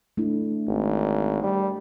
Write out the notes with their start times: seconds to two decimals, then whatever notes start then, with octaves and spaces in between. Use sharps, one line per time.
0.17 A3 D4 E4
0.68 G#1
1.43 G3